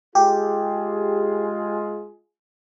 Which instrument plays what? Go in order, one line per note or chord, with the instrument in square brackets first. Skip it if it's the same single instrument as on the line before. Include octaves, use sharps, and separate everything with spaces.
[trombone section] G#3 F4 G#4 [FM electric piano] G4